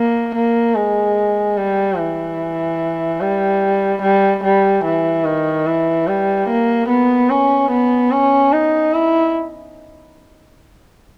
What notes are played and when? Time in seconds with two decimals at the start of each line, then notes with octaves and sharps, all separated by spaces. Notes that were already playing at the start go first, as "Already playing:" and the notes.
Already playing: A#3
0.35 A#3
0.75 G#3
1.57 G3
1.98 E3
3.21 G3
4.02 G3
4.44 G3
4.84 E3
5.25 D#3
5.67 E3
6.07 G3
6.49 A#3
6.88 B3
7.30 C#4
7.71 B3
8.12 C#4
8.53 D#4
8.94 E4